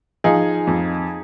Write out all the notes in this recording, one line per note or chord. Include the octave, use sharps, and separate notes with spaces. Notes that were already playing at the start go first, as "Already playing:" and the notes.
F3 D#4 G#4
F2